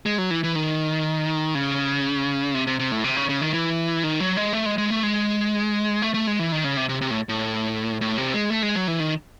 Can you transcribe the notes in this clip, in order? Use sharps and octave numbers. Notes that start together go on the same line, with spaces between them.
G#3
F#3
E3
E3
D#3
C#3
C3
C3
C3
A2
C3
C#3
C#3
D#3
E3
D#3
F#3
G#3
A3
G#3
G#3
A3
G#3
A3
A3
G#3
E3
D#3
C#3
C3
C3
C3
A2
A2
A2
C3
G#3
A3
G#3
F#3
E3
D#3